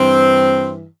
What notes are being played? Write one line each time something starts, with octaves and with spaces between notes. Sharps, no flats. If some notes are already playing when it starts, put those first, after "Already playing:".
Already playing: G2 E3 C4